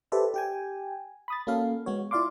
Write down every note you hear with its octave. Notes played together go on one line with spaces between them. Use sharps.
G4 A4 B4 C5 D5 E5
G4 G5 G#5
B5 D#6 A6
A#3 C#4 F#4 A4 F5
G#3 B3 F#4 C#5
E4 F4 D5 F5 C6 D6